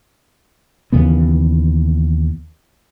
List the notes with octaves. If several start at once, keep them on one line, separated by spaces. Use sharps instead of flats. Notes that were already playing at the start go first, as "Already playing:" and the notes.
D#2 C#3 E3 B3